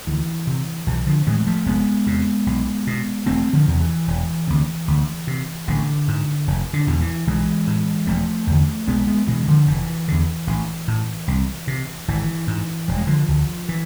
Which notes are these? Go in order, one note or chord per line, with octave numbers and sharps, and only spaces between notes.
D2 E3
C3
B1 E3
D3 F3
A2 E3 G#3
F3 A3
F1 G#3 B3
E2 C3
B1
B2
E1 A3 C4
D3 F3
E2 C3
E3
E1
D2 C3
D2
C3
A1 D3
G#2
F1
D3
E2 B2
E3
B1 E3 G#3
A2
E1 F3 A3
E2 D3
B1 G#3 B3
G#3 B3
B2 E3 G#3
D3 F3
F1 E3
E2 D3
A1
A2
C2
C3
G#1 E3
G#2
E1 F3
G#3
D3 F3
D2 D3
E3